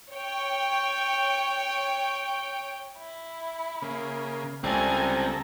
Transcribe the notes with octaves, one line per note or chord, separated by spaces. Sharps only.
C#5 G5
E4
C#3 A#3
C#2 G3 C4 A4 G#5 A#5